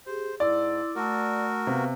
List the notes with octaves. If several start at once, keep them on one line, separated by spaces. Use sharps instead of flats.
G4 G#4 C5
G#2 E4 D5 C6 E6
A3 F#4 A#4 A5 E6
C3 B3 B4 F5